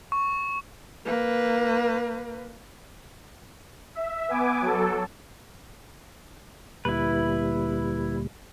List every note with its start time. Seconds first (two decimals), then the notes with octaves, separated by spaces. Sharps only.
0.12 C#6
1.06 A#3 B4
3.95 E5
4.29 B3 G#5 D6
4.61 F#3 A4
6.85 D2 A#2 G3 E4 B4